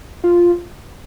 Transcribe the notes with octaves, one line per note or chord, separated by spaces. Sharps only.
F4